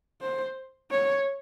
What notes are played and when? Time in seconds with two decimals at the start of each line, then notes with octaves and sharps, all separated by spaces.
0.21 C5
0.91 C#5